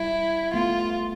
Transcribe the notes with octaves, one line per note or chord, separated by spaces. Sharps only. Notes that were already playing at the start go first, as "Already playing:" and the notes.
Already playing: G3 E4
A3 B3 F4